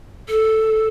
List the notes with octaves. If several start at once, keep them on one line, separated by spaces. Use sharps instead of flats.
A4